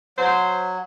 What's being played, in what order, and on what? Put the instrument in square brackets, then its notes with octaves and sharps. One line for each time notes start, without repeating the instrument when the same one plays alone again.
[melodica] F#3 [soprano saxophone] C5